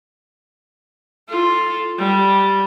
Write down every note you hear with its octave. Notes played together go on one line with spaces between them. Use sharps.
F4 A4
G3